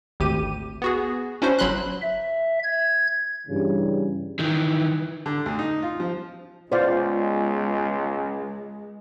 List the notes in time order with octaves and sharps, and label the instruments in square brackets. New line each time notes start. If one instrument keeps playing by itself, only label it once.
[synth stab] G#1 D2 G4 D#7
B3 F#4 G#4
C#4 D4 E4 F#4 C5
G1 F#3 B5 C6 F#6
[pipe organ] E5
G#6
[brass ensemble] G2 C#3 E3 G3
[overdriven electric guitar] D#3 E3
[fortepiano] D3
D2
D#4
F4
F3
[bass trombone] C#2 [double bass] G#3 [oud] B3 F4 [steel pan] C5 D5 F5